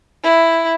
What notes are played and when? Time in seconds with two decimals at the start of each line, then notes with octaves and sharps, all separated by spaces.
0.23 E4